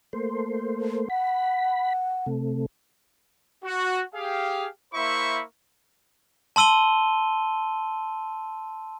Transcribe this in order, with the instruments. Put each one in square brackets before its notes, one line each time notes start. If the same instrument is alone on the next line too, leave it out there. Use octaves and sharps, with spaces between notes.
[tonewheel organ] A3 A#3 C5
[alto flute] F#5 [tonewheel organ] B5
[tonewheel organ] C3 A3
[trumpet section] F#4
G4 G#4 F5
A#3 E4 C5 E5 B5 C#6
[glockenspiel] A5 C6 E6 D#7 G7